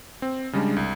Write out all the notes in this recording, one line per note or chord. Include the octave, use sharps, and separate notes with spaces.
C4
C#3 G3 G#3 D4
C2